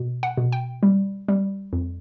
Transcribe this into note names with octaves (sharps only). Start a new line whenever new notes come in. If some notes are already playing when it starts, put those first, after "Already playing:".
Already playing: B2
F#5
B2
G5
G3
G3
F2